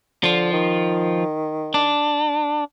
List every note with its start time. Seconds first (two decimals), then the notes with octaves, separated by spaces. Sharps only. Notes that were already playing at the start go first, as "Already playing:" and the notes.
0.23 D3 F3 F4
0.53 D#3
1.74 D4